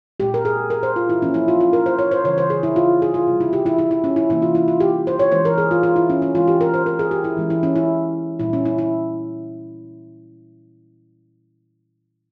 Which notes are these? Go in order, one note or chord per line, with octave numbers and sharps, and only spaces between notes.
A#2 G#3 C4 G4
A#4
G#4
A#4
C5
F4
E4
F3 A#3 C#4
E4
F4
F4
A#4
C5
C#5
C5
C#3 E3 G3 C#4 C#5
C5
G#4
E4
F4
G#4
F4
C3 G3 C4
E4
G4
E4
E4
E4
C#4
E4
C3 E3 A#3 C#4 E4
F4
E4
F4
G4
C5
C#5
E3 G#3 C#4 C5
A#4
G#4
F4
F4
E4
C#4
C#4
E3 G#3 C4 F4
G4
A#4
C5
A#4
G#4
G4
E4
E3 G#3 C#4
E4
C#4
E4
A#2 G3 C#4 E4
C#4
E4
E4